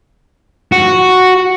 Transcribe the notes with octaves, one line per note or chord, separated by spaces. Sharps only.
F#4